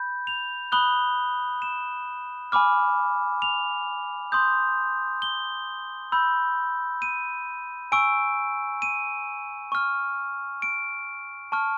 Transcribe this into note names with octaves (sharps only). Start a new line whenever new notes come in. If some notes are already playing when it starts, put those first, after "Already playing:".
Already playing: B5 G6
F7
B5 D#6 F#6 G7
E7
G#5 B5 D6 F6
F7
C6 D#6 G6
G7
B5 E6 G6
D#7
G#5 C#6 E6 D7
D#7
C#6 F6
D7
A5 C#6 F6